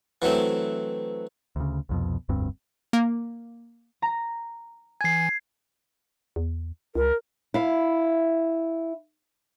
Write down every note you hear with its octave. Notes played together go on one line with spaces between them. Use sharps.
E3 F#3 A3 C4
D2 C#3
C2 F2 B2
F1 D2 G2 C4
A#3
A#5
E3 G#5 G#6 C7
E2
C#2 A#4
E4 F5